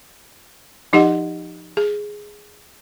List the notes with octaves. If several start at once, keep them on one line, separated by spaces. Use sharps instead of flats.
F3 D#4 G4 D#5 F#5
G#4